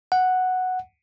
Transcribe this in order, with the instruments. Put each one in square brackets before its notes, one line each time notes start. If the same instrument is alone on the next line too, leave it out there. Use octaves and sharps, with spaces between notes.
[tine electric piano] F#5